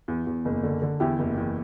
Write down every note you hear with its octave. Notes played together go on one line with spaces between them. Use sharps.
E2
E2
F#1
D3
D3
E2 E4 G4
F#1
E2